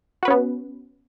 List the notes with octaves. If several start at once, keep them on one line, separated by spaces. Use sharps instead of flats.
B3 C#4 F#4 B4